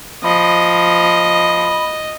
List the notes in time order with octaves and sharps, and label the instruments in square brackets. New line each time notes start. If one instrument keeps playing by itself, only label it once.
[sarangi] F3 [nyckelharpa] D#5 [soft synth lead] B5